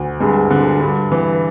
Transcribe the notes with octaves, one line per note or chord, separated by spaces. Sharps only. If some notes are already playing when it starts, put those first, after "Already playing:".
Already playing: D2
G2 G#3
D3
G2
E3